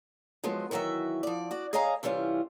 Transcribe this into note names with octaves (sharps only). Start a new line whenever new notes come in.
F3 F#3 G#3 B3
D#3 E3 F#3 F#4 E5
F3 D5
F#4 D5
G#4 C#5 D#5 F5 G#5 A#5
C3 E3 G3 C#4 F4